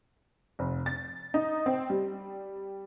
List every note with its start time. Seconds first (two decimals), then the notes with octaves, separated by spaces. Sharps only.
0.59 F1
0.86 A6
1.34 D#4
1.66 C4
1.90 G3